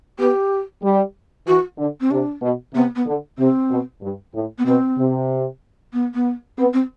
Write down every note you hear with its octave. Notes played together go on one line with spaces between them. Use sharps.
B3 G4
G3
E3 F#4
D3
C4
C3 D4
B2
C3 B3
B3
D3
C3 C4
B2
G2
A2
B3
B2 C4
C3
B3
B3
B3 C4
C4